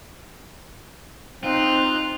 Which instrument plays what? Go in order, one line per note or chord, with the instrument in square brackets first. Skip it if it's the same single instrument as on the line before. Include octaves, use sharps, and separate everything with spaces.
[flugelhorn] C4 [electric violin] D#4 F#6 [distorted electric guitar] F4